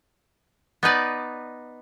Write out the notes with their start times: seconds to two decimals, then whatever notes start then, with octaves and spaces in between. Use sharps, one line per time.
0.83 B3 D#4 B4 D5